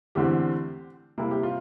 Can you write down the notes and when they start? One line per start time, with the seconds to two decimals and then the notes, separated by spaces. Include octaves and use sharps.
0.15 E2 D3 A3 C4 G4
1.18 C3 G3 A#3 E4
1.31 G4
1.43 F4